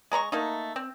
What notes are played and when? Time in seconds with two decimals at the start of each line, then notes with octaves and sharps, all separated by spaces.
0.12 G#3 A#5 B5 C#6
0.32 A3 A#3 D#4
0.76 C4